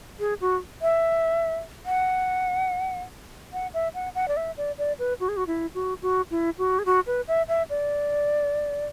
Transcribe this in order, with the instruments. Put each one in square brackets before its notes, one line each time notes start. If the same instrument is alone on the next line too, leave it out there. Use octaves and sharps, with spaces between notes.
[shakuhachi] G#4
F#4
E5
F#5
F#5
E5
F#5
F#5
D5
E5
D5
D5
B4
F#4
G#4
F#4
E4
F#4
F#4
E4
F#4
G#4
F#4
B4
E5
E5
D5